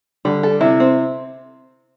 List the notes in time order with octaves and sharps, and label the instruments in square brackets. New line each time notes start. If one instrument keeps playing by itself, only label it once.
[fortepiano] D3 [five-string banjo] G3
[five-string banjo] A4
[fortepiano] C3 [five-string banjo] E4
[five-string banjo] C4